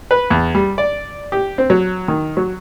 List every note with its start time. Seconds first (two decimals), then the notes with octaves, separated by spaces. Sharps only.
0.11 B4
0.30 E2
0.55 G3
0.78 D5
1.32 G4
1.58 C4
1.70 F#3
2.08 D#3
2.37 F#3